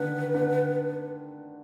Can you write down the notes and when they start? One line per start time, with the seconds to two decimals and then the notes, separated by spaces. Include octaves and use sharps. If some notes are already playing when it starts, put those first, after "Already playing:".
Already playing: D3 D#3 B4
0.34 D3